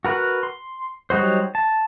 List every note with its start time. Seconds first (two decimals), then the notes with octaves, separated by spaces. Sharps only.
0.05 F#4 A#4 B4
0.43 C6
1.10 F#3 G3 D#4 F#4 C5
1.55 A5